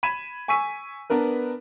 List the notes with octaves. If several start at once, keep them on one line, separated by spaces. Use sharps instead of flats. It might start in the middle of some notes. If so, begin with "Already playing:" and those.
B5 G#6 B6 D#7 E7
G#5 C#6 E6 B6 D#7
B3 D4 A#4 B4